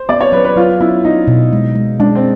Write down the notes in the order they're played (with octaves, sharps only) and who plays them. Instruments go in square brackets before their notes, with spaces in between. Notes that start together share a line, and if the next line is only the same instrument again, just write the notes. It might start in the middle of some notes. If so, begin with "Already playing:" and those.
Already playing: [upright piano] C5
[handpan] B3 [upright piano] D5
[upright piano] C#5
[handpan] F#3 [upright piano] B4
[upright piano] B4
[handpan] F#3 [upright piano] F4
[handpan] B3 [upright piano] E4
[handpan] B3 [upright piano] D#4
[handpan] B2
G#3
G#3
[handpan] G#3 [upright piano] D4
[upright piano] C4